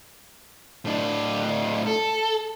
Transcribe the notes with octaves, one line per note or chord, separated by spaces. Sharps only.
A2 D4
A4